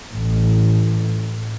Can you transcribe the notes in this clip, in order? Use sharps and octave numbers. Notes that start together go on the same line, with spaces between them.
A1